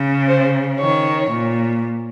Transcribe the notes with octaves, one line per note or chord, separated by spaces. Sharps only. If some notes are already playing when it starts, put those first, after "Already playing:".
Already playing: C#3
C5
D#3 C#5
A#2